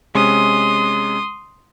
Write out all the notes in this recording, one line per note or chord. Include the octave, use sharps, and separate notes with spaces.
C3 G#3 C#4 C6 D#6